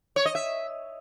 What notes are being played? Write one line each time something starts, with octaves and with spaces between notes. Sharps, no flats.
C#5
D#5
E5